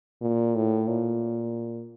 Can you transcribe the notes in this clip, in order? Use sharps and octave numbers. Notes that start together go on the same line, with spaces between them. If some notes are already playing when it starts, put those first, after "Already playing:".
A#2
A2
A#2